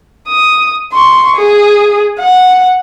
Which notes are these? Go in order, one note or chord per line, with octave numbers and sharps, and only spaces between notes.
D#6
C6 C#6
G#4
F#5